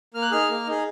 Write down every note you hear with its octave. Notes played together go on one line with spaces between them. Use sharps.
A#3 F6
F#6
D#4 G#4 F6
A#3
D#4 G#4